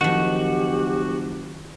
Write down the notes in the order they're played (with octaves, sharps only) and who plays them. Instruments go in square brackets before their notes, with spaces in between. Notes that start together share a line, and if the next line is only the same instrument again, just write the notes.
[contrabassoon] F#1 [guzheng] D#3 F3 [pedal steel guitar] F#4 [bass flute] G4